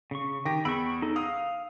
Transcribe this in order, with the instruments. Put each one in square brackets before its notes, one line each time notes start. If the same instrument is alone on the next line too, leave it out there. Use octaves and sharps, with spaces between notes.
[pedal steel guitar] C#3 C#6
[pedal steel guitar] D#3 G4 [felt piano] G5 D6 A#6
[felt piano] E2 E6 D7 [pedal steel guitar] B5 C#6
[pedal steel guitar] D#4 A4
[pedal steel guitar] F5 [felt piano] D#6